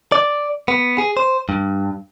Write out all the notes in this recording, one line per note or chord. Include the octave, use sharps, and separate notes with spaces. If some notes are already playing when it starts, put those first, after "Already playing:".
D5
B3
G#4
C5
G2